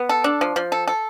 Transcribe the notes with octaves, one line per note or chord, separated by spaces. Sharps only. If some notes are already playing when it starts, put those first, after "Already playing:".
Already playing: B3
A4
D4
F3
F3
A4
A4